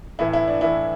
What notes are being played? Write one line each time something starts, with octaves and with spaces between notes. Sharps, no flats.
A2 E3 E4
E4
D4
A2 E3 E4